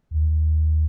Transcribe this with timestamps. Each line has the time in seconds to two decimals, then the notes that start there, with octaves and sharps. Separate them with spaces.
0.11 D#2